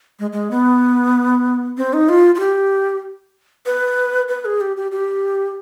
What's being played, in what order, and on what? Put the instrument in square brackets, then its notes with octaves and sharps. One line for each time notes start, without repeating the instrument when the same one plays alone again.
[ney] G#3
G#3
B3
C4
D#4
F4
F4
G4
B4
B4
G#4
G4
G4
G4